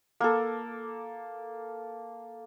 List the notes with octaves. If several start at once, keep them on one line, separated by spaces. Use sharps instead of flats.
A#3 A4